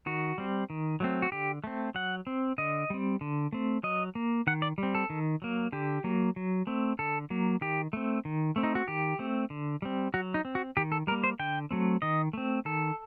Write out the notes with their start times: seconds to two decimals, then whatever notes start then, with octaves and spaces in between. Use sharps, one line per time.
0.06 D#3 F#4
0.38 G3 C4
0.70 D#3
1.00 F#3 A3 C4
1.22 F#4
1.32 D3 G4
1.64 A3 C4
1.95 F#3 F#5
2.27 C4
2.58 D3 D#5
2.90 G3 C4
3.21 D3
3.53 A3 C4
3.83 F#3 D#5
4.15 A#3
4.47 D#3 F#5
4.62 D5
4.78 G3 C4
4.95 A4
5.10 D#3
5.42 F#3 A#3
5.72 D3 G4
6.04 F#3 A#3
6.36 F#3
6.67 A3 C4
6.99 D3 A4
7.30 F#3 A#3
7.61 D#3 G4
7.93 A3 C4
8.25 D#3
8.56 A3 C4
8.63 D#4
8.75 F#4
8.88 D#3 G4
9.19 A3 C4
9.50 D3
9.82 G3 C4
10.14 F#3 F#4
10.34 D#4
10.45 C4
10.55 F#4
10.77 D#3 G4
10.92 A4
11.07 G3 A#4
11.11 A#3
11.24 C5
11.39 D3 G5
11.71 F#3 A3 C4
12.02 D#3 D#5
12.33 A3 C4
12.65 D#3 A4